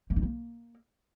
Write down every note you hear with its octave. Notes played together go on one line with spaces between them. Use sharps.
A#3
D#4
A#3